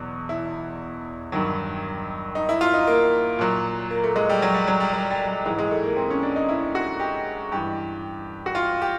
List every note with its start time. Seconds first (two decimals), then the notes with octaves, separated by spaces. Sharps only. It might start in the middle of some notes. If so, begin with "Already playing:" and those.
Already playing: E2 B2 F#3
0.29 E4
1.32 G2 D#3 F#3
2.35 D#4
2.49 E4
2.61 F4
2.74 D#4
2.87 A#3
3.39 A#2 F#3
3.91 A#3
4.04 A3
4.16 G#3
4.29 G3
4.42 F#3
4.54 G3
4.67 F#3
4.80 G3
4.93 G3
5.10 G3
5.28 G3
5.45 G#2 E3 G#3
5.58 G#3
5.71 A3
5.84 A#3
5.96 C4
6.10 C#4
6.23 D4
6.36 D#4
6.49 E4
6.75 F#4
7.00 G4
7.52 G2 E3 G4
8.46 F#4
8.55 F4
8.82 G4